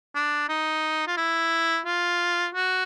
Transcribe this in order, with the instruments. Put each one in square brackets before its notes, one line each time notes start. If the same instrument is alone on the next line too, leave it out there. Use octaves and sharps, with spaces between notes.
[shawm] D4
D#4
F4
E4
F4
F#4